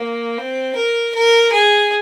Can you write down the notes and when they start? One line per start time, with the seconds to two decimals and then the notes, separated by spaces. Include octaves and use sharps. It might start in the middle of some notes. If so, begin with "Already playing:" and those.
Already playing: A#3
0.38 C4
0.76 A#4
1.14 A#4
1.52 G#4